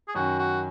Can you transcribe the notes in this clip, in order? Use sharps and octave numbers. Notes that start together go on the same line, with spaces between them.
G#4
F#2 D#3 F#3 C#4 F#4
F#4